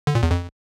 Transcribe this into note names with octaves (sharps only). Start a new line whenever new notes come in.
D3
A#2
E2
F2